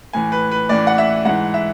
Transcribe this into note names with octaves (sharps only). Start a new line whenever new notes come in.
A2 E3 G#5
B4
B4
A2 E3 D5
F#5
E5
G#2 E3 F#5
E5